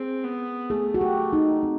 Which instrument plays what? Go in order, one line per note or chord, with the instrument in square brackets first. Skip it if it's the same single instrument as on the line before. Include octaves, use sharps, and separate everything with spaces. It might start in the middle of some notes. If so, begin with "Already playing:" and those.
Already playing: [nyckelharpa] C4 [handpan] G#4
[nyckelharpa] B3
[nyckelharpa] A3 [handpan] G#4
[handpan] F#4
G4
D#4
C4